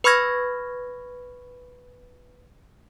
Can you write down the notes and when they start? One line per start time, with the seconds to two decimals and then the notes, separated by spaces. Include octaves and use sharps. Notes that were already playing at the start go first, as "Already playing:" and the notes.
0.04 B4 B5 C#6 F6 G#6 A#6